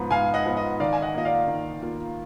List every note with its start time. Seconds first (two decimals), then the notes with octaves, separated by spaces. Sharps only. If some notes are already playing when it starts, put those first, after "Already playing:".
Already playing: G#2 F3 B3
0.11 G#2 F5 G#5
0.34 D#5 F#5
0.46 F3 B3
0.57 D#5
0.80 D#3 D5 F5
0.93 G#5
1.02 D#5 F#5
1.14 A#3 F4 D#5
1.25 D5 F5
1.48 D#3
1.82 A#3 F4